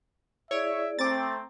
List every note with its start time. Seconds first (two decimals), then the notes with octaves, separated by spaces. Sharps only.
0.51 E4 G#4 C#5 D5 E5
0.99 A3 C4 A#5 D6 A6